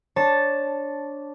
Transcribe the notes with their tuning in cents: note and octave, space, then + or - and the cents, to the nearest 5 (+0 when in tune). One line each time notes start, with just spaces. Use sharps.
D4 -10 C#5 -25 A5 +0